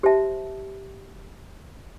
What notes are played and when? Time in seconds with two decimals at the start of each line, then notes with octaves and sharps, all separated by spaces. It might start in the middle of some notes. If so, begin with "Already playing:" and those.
0.03 G4 C5 E5 A5